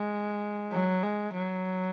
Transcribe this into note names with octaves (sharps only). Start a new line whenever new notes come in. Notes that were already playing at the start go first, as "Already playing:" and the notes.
Already playing: G#3
F#3
G#3
F#3